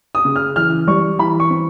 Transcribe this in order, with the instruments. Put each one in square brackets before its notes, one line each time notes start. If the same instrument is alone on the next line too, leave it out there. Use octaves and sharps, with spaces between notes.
[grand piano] D#6
[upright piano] C#3
[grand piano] F6
[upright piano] E3 [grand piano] F6
[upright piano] G3 [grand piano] C#6
[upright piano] E3 [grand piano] B5
[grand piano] C#6
[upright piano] C4